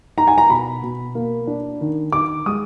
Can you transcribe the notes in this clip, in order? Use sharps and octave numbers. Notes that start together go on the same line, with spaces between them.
D#4 A#5
G#5
A#5
B2 B5
B2
A#3
D4
D#3
D#3 D6
G#3 D#6